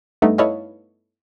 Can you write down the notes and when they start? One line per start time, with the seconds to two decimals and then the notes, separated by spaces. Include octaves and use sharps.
0.22 G2 A3 B3 D#4
0.38 E4 A4 B4 C#5 D#5 F5